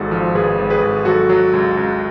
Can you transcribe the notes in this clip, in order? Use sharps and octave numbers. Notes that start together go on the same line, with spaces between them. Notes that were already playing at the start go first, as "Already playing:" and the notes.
Already playing: G#1 G#2 F#4 A4
F3
G#1 G#4 B4
G#1
G#4 B4
G#1
F#3 F#4 A4
F#3
C#2
C#2